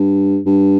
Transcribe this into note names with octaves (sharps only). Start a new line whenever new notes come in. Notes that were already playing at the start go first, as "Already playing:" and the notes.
Already playing: G2
G2